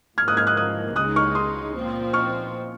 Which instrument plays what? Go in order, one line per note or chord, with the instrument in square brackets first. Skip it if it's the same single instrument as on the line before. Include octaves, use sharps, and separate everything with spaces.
[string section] G#2 F3 A#3 [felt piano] F6 G#6
[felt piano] D#6 F#6
F6 G#6
D#6 F#6
D#6 F#6
[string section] C#2 C#3 G#3 D#4 [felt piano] D#6 F#6
[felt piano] C#6 F6
C6 D#6
[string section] A#2 F3 C4
[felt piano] C#6 F6